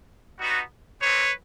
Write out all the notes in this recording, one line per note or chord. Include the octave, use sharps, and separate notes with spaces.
G3 B3 D#4 F#4
G#3 C4 D#4 G4 B4 C#5